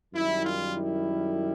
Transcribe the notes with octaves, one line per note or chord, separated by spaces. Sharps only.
F#2 D#3 G3 E4
F4
E4